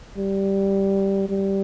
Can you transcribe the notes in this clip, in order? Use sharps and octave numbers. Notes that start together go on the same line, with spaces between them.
G3
G3